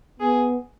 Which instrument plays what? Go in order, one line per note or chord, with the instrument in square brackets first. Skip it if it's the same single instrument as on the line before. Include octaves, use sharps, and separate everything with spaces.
[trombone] B3 [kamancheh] G#4